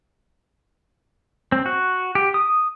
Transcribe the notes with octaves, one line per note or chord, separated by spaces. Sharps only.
C4
F#4
G4
D#6